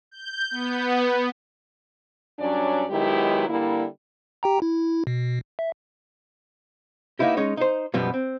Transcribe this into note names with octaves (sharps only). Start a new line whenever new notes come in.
G6
B3
G2 F#3 C#4 D4 D5
D#3 F#3 G#3 B3 E4 G4
D3 G3 A#3 E4
G4 G5 A#5
E4
B2
E5
A#3 B3 D#4 E4 G4
G#3 C#4 D#4 C#5
D#4 C5
F#2 B2 F3 G3 B3
C4